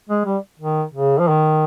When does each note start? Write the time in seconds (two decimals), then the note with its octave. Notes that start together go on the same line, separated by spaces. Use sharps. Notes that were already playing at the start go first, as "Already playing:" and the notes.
0.09 G#3
0.25 G3
0.59 D#3
0.94 C#3
1.19 F3
1.28 D#3